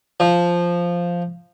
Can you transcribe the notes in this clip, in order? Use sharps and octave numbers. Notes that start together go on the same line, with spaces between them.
F3